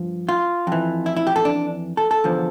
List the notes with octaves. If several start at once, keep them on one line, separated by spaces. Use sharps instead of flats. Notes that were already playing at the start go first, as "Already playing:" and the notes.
Already playing: G2 F3
F4
F2 E3
E4
E4
G4
A4
D4
A4
A4
E2 D3 F3